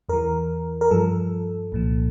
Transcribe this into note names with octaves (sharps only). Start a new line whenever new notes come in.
E2 E3 A#4
A#4
G2 F3 A4
C2 A#2 F3